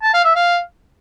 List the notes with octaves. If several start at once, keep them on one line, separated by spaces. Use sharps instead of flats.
A5
F5
E5
F5